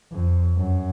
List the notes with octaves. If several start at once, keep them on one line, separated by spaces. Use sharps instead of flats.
F2
F#2